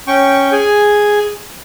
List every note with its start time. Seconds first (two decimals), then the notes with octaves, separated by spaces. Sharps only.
0.07 C#4 G5 C#6
0.52 G#4 G#5